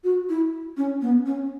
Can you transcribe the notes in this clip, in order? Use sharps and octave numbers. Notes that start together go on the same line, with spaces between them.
F#4
E4
C#4
B3
C#4